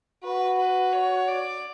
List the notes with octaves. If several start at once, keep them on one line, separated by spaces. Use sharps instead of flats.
F#4 B4
B4
C#5
D5